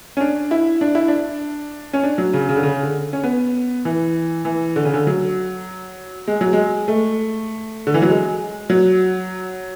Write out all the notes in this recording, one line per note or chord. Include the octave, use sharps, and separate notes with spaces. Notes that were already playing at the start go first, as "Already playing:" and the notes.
C#4
D4
E4
D4
E4
D4
C#4
D4
F#3
C#3
C#3
D3
C#3
D3
C#4
B3
E3
E3
D3
C#3
D3
F#3
G#3
F#3
G#3
A3
D3
E3
F#3
G#3
F#3